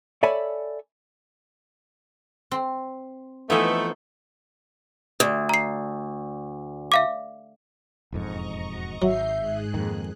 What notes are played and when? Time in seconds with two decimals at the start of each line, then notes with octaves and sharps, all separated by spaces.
0.23 A4 C#5 D5 E5 G#5 B5
2.51 C4
3.50 E3 F3 A3 B3 D#4 G#5
5.20 D2
5.49 A#5 C7
6.92 E5 F5 D6
8.12 E1 F2 G#2 D#5 A#5 C#6
8.70 F#4
9.02 G#1 F#3 E5 G6 C7
9.39 G#2 G#4 F#6
9.74 F2 D#3 A#3